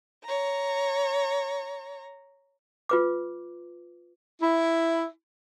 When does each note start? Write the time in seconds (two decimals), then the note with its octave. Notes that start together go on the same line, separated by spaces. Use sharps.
0.25 C#5 A#5
2.89 F4 B4 D6
4.42 E4